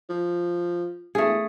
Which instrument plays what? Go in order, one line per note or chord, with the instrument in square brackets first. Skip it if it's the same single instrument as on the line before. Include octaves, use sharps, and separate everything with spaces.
[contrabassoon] F3
[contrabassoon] E1 [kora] A3 G#4